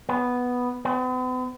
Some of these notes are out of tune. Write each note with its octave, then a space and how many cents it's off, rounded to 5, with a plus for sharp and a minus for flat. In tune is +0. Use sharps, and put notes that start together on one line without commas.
B3 +0
B3 +45